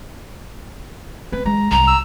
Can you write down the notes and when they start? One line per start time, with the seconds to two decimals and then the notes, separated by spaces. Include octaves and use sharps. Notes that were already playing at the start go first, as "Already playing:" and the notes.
1.32 C4 B4
1.46 G#3 A#5
1.71 C2 A#5
1.88 E6